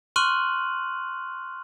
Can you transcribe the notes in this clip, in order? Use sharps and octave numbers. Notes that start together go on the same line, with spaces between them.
C6 C#6 F6 F#6 D#7 F#7